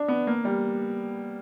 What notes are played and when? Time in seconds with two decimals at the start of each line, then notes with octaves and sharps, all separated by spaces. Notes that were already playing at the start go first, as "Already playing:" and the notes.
Already playing: D4
0.08 B3
0.27 A#3
0.45 G3